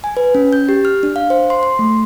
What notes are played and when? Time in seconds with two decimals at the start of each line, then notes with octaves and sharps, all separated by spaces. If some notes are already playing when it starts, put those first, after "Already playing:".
0.04 G#5
0.17 B4
0.35 C#4
0.53 G6
0.69 G4
0.85 F6
1.03 D4
1.16 F5
1.30 C5
1.50 C6
1.63 C6
1.79 A3